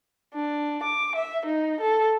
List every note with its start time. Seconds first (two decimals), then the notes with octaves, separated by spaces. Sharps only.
0.34 D4
0.84 D6
1.15 E5
1.46 D#4
1.80 A4